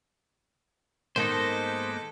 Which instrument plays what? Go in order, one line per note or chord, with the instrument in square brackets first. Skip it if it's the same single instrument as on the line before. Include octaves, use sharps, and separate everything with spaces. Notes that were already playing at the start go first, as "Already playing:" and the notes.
[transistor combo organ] G#2 B3 D6 [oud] D#3 A#3 [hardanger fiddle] A4 [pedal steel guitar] C5 D#5